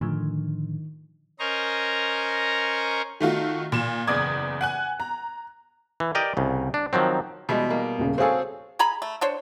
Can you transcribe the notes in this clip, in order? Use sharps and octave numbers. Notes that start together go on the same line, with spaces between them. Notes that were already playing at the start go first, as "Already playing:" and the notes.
A2 D3 D#3 F3
C#4 A#4 C5 D#5 A#5 C#6
D#3 A3 F4 F#4
A#2 E7
F#1 E2 D5 D#6 G#6
F#5 G#5 F#6
A#5
E3
G4 A#4 D5 D#5 G5
C2 C#3
D4
D#3 F3 F#3 C4
B2 E3 G3 G#3
A#3
D#1 C#3
C4 F#4 G#4 A4 C#5 F5 G#5
G#4 G#5 A#5 B5
A3
D4 C5 C#5